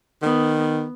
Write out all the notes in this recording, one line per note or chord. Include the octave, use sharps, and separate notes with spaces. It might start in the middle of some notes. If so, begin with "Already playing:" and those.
D#3 B3